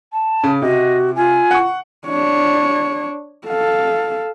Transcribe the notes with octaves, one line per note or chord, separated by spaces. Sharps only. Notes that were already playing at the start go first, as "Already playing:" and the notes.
A5
C#3
C3 F#4 D#5
F4 G#5
F#5 C#6
D4 C#5
A4 F5